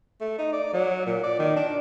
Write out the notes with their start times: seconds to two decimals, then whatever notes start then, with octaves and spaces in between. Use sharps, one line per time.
0.21 A3
0.38 D#4
0.53 D5
0.74 F#3
1.06 A#2
1.23 D5
1.39 D#3
1.56 D4